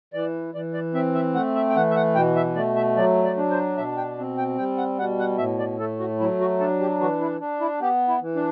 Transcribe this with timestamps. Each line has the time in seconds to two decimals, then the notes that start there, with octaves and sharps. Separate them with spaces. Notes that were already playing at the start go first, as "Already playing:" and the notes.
0.13 E3 D5
0.55 E3 D5
0.74 D5
0.94 C4 E5
1.15 E5
1.34 A3 F#5
1.56 E5
1.70 G5
1.75 E3 F#5
1.91 E5
1.96 F#5
2.15 B2 G5
2.36 E5
2.55 A3 D5
2.76 E5
2.96 F#3 D5
3.24 D5
3.37 D4
3.51 C5
3.77 B2 E5
3.97 G5
4.18 C4
4.38 G5
4.57 G3 G5
4.78 F#5
4.98 B2 F#5
5.19 F#5
5.38 A2 E5
5.59 D5
5.79 A3 A4
5.99 F#4
6.20 F#3 E4
6.40 F#4
6.59 D4 A4
6.81 G4
7.00 E3 F#4
7.21 E4
7.40 D4
7.61 E4
7.81 B3 G4
8.08 E4
8.21 E3
8.36 D4